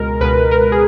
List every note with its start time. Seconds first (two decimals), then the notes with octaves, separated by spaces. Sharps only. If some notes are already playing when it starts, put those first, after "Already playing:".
Already playing: C#2 B2 G#3 A#4
0.21 C#2 B2 G#3 B4
0.51 A#4
0.72 G#4